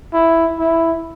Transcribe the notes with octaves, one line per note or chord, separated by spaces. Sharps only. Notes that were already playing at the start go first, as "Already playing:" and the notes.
E4
E4